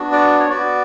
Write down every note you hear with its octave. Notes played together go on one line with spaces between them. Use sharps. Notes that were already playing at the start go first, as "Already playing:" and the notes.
Already playing: B3 D4 F#4
D5
C#5
B3 F#4 D5